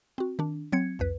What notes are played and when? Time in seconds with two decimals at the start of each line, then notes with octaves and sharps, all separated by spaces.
0.18 C4 F#4
0.39 D#3 D4
0.72 F#3 C4 G#6 C#7
0.99 C2 F2 B4